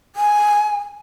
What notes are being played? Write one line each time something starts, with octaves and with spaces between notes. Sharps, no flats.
G#5